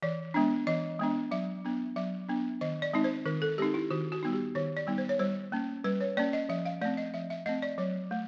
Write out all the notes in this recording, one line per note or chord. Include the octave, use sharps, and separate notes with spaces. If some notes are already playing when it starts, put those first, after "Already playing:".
E3 D5
G#3 B3 D4
E3 D#5
G#3 B3 D4
F#3 E5
B3 D4
F#3 E5
B3 D4
D#3 D#5
D5
G#3 C4 D#4
C5
D#3 A#4
A4
G#3 C4 D#4 G4
E4
D#3 F#4
F#4
G3 B3 D#4
G4
D#3 C#5
D5
G3 B3 D#4
C5
C#5
G3 C5
A#3 C#4
G3 B4
C#5
A#3 C#4 D5
D#5
F3 E5
F5
A3 C4 D5
D#5
F3 E5
E5
A3 C4 D#5
D5
F#3 C#5
A3